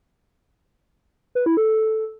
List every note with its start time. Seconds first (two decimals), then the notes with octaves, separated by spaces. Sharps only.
1.35 B4
1.46 E4
1.57 A4